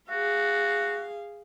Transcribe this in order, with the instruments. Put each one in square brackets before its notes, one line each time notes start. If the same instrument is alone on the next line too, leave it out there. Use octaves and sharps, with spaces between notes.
[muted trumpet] F#4 [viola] G#4 F5